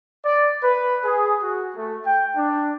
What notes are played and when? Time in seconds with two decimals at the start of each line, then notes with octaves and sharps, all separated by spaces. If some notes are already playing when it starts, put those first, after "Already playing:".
0.25 D5
0.62 B4
1.02 G#4
1.42 F#4
1.76 A3
2.05 G5
2.35 D4